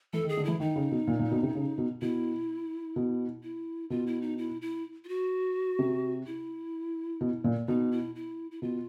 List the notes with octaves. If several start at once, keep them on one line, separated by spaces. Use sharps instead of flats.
E3 A4
D#3
G#4
D3
E3 E4
D#3 D#4
C#3
B2
A#2
A#2
B2
C3
C#3
B2
B2 E4
B2
E4
B2 F4
E4
D#4
E4
E4
F4
F#4
C3
E4
B2
A#2
B2 D#4
E4
E4
E4
B2 F4